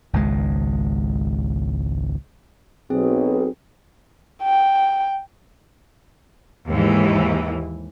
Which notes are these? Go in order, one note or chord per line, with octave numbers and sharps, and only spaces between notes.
G#1 C#2 G#3
B1 C4 G#4
G5
D#2 G#2 E3